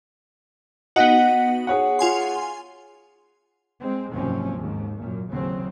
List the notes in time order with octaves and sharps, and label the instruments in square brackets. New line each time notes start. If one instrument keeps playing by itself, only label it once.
[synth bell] B3 D#4 F#4 [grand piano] D#5 F#5
[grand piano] G#4 C#5 F#5
[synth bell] F4 G#5 C6
[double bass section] G#3 C4
F#1 G#2 C3 F3 C4 C#4
D#2 G#2
F#2 A#2
A1 D#2 C#3 F#3 C4 C#4